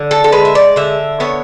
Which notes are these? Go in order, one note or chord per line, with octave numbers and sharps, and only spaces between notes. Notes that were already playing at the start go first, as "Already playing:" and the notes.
Already playing: D3
A4
A4
G#3 B4
E5
D5
D3 E5
B3 C#5